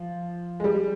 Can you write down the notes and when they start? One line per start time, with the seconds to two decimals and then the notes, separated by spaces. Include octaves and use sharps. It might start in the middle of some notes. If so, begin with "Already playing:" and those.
Already playing: F3
0.60 G#3
0.64 G3